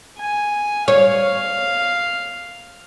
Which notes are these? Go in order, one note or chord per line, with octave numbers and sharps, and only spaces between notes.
G#5
C#5 F5